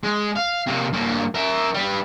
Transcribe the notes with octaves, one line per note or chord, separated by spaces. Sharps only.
G#3
F5
C3 A#3
G2 A#3
A#4 E5
G3 B4